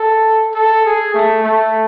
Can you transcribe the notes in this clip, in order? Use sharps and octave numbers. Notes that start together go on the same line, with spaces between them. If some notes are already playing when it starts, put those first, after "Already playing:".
Already playing: A4
A4
G#4
A3
A3